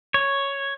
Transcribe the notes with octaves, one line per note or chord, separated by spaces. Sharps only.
C#5